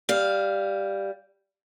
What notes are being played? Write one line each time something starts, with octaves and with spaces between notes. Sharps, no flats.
G3 F5